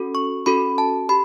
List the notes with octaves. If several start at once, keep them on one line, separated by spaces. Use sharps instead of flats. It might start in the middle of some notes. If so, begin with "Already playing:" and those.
Already playing: C#4 F#4 A4
C#6
C#4 F#4 A4 B5
A5
G4 B5